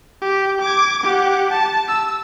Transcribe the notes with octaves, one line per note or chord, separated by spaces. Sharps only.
G4
D6 G#6
G4 F#5
A5
E6